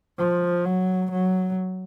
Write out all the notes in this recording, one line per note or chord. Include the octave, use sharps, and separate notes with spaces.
F3
F#3
F#3